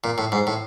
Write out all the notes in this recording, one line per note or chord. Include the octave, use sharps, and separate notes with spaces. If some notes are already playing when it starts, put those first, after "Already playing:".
A#2
A2
G#2
A2